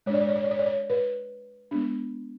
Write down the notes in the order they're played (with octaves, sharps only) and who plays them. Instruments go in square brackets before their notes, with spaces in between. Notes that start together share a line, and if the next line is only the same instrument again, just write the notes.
[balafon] G#3 C#5
D4 D5
C#5
D5
C#5
D5
C#5
D5
C#5
B4
G#3 B3 D4